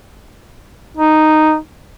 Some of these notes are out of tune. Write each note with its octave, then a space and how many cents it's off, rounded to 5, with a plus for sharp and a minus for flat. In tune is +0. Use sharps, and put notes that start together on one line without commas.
D#4 -5